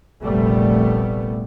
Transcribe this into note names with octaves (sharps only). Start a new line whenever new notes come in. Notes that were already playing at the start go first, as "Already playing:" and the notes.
F1 A#1 A#2 G3 A3 B3